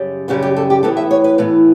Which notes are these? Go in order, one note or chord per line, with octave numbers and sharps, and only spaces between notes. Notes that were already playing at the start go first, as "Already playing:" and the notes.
Already playing: F#2 C#3 G3
F#2 C#3 G3 B3 F#4
G4
A4
G4
A2 E3 B3 A4
E5
C#5
B4
A2 E3 B3